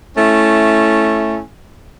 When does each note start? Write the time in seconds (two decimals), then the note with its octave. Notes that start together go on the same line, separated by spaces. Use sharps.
0.16 A3 C#4 E4